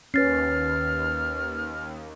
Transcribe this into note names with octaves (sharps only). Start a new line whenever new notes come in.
D#2 C#4 B4 F6 A6 C7